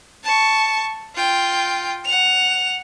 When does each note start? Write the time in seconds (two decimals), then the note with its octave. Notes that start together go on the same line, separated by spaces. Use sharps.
0.24 A5 C#6
1.15 F4 G5
2.05 F#5 F7